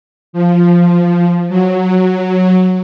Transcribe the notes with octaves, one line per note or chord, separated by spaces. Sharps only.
F3
F#3